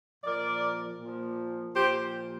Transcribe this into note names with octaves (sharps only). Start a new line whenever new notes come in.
A#2 F3 A#4 D5
A#2 F3
A#2 F3 G4 C5